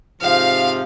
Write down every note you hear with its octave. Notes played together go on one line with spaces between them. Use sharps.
G#2 C3 F3 F5